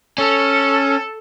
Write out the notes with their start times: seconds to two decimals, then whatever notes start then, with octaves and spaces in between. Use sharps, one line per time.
0.18 C#4 A4